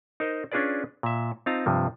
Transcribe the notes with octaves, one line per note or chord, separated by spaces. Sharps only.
D#4 A#4 C5 D#5
C#4 D4 F4 G#4 B4 D5
A#2 E5
C4 D#4 F4 F5 A5 A#5
G2 C3 F3